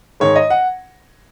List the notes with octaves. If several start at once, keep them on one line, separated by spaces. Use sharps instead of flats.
G#2 D#3 G#3 C#5
D#5
F#5